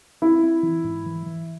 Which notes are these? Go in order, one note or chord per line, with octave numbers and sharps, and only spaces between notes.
C4 E4
C4
E3
G#2
E3
E3